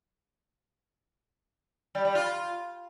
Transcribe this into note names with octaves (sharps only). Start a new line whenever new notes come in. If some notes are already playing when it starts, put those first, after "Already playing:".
G3
G3
F4